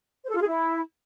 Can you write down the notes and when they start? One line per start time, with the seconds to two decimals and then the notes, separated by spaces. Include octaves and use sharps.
0.25 C5
0.30 A4
0.36 F4
0.41 G#4
0.46 E4